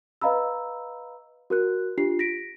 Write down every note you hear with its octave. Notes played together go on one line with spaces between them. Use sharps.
B4 D#5 F5 A#5 B5 E6
F#4 A#4 F#6
D4 F4 G4 C7
A#6 B6 D7